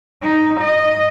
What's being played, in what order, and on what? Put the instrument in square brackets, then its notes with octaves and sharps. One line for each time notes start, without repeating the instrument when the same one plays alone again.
[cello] D#4
D#5